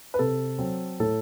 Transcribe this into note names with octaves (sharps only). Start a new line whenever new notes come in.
B4
C3 A4
F#3 C4
A2 A4